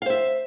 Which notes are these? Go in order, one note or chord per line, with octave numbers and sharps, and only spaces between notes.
C5 E5 F5